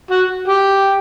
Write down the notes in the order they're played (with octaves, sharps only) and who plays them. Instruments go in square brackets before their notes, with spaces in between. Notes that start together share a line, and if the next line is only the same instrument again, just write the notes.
[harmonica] F#4
G4